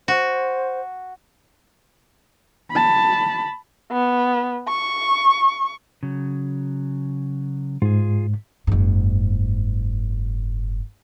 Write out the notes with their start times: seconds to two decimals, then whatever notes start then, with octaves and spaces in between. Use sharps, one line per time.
0.08 F#4 C5
2.71 A5 B5
3.92 B3
4.69 C#6
6.03 C#3 F#3
7.82 G#2 F4 G#4
8.67 F#1 G#2